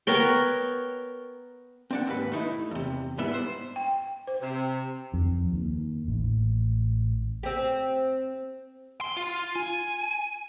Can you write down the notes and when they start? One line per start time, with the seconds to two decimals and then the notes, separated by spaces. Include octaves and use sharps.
0.07 B3 A#4 C#5 G5
1.91 C4 D4 F#5
2.07 D#2 G#2 B4
2.32 A3 D#4 E4
2.71 E2 C3
3.18 G#2 G3 B3 E4
3.34 C5
3.76 G5
4.27 C5
4.42 C3
5.14 F2
5.53 D#2
6.08 A1
7.43 C4 G4
9.01 C6
9.17 F4
9.56 G#5